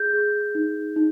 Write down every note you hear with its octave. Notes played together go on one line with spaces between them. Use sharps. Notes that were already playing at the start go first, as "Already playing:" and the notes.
Already playing: G#4 G6
G#4
D#4
D#4